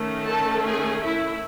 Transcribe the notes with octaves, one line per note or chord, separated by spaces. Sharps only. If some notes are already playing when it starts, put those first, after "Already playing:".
Already playing: D#3 A3 C#4
A4 A5
G#4 G#5
E4 E5